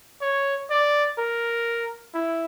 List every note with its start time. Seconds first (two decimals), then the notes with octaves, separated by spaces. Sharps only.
0.21 C#5
0.71 D5
1.18 A#4
2.14 E4